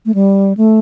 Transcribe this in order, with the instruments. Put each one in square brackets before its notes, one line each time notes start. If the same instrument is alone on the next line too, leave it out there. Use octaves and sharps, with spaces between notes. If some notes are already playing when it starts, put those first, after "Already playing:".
[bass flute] A3
G3
A3